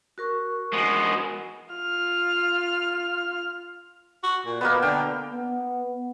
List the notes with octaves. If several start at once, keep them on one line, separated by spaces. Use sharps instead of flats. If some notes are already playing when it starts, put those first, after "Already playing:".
F#4 A#4 C#6
G#3 B3
F4 F6
F#4
A#2
B2 A#3 B3
D3 G5
B3